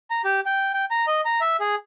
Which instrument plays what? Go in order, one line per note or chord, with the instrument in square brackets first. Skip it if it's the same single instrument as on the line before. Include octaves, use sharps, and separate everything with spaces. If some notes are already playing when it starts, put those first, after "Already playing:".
[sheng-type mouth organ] A#5
G4
G5
G5
A#5
D#5
A#5
E5
G#4